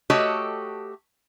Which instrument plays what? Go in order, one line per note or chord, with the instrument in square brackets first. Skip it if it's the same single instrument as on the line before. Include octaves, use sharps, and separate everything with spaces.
[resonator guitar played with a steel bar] A3 F#4 G4 A4 C#5 D#5